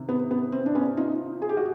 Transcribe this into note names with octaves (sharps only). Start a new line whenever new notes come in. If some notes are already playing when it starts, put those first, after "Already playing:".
Already playing: C3 D#3
B3
B3
C4
D4
B3 C#4
D#4 F4
G#4
G4
F#4